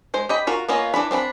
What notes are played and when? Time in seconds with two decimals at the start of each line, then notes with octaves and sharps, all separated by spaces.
0.14 G#3 C5
0.29 G4 D#5 B5
0.47 F4 F#4 A#4
0.69 A#3 B3 C#4 F4 D#5
0.94 E3 D4 B4 B5
1.11 C4 D4 D#5 B5